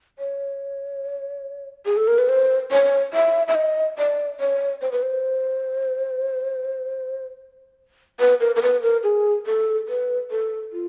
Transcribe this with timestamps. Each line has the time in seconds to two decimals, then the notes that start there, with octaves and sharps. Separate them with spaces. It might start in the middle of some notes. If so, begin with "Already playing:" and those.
0.19 C#5
1.86 G#4
1.97 A4
2.08 A#4
2.18 B4
2.29 C5
2.71 C#5
3.14 E5
3.48 E5
3.55 D#5
3.98 D5
4.40 C#5
4.82 C5
4.92 B4
5.02 C5
8.20 B4
8.41 A#4
8.56 A#4
8.62 B4
8.83 A#4
9.03 G#4
9.46 A4
9.88 B4
10.31 A4
10.73 F4